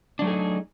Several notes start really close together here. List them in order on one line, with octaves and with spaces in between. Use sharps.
D4 F#3 A3 G#4 D#4